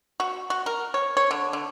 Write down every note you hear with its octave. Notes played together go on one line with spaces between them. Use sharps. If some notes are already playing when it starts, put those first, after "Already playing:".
F#4
F#4
A#4
C#5
C#5
D3
D3